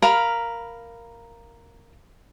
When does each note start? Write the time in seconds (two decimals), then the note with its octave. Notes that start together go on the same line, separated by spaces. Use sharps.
0.02 A#4 F5 B5